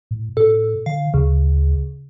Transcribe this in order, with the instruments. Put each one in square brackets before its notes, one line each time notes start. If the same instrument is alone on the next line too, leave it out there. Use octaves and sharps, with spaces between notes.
[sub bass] A2
[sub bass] A2 [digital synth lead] A4
[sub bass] D3 [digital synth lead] F5
[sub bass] D2 [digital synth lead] C#3